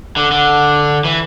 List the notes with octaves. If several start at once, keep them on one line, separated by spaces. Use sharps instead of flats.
D3
D3
E3